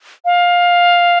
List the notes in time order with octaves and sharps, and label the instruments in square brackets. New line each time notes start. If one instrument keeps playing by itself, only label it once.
[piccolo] F5